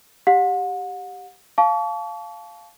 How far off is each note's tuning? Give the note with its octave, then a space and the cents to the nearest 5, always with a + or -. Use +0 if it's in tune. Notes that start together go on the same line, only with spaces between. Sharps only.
G4 +0 F#5 -35
F5 +0 A5 -25 C#6 +40